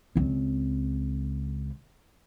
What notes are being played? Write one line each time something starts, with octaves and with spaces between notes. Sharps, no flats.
C#2 C4